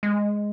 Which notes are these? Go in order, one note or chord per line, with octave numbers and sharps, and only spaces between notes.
G#3